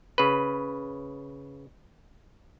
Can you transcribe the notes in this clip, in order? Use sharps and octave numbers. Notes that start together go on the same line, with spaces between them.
C#3 B4